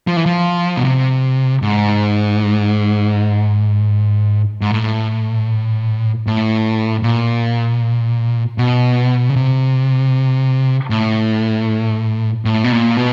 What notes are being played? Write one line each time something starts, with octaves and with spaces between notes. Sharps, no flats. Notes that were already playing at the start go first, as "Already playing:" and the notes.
F3
E3
F3
B2
C3
G#2
G#2
A2
A2
A#2
B2
C#3
C3
A2
A2
B2
A#2
B2